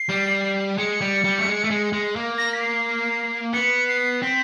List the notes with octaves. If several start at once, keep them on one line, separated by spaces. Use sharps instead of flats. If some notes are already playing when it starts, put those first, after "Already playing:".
Already playing: C7
G3
G#3 C#7
G3
G3
A3
G#3
A3
G#3
G#3
A#3
A#6
B6
C7
B3 C#7
C7
C4 B6